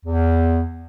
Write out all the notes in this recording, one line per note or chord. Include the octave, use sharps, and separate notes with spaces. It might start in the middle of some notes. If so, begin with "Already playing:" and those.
E2